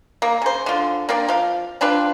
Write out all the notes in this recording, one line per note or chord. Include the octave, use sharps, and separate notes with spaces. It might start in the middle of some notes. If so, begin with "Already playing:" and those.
A#3
C#3 C5
D3 F4
A#3 C4 D4 D5
F3 F5
C4 D4 F4 B4